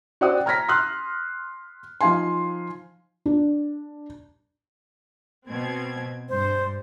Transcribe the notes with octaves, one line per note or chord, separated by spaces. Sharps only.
F#4 C5 D5 F#5 G5 D#6
A#5 F6 G#6 A#6 B6
C6 D#6 F6 F#6
F3 D#4 F5 G#5 C6
D4
B2 C4 G#6
G2 C5